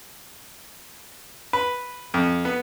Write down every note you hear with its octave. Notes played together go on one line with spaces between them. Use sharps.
B4
F2
B3